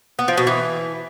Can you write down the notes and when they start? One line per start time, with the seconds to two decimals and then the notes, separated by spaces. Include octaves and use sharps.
0.19 B3
0.28 F3
0.37 B2
0.47 E3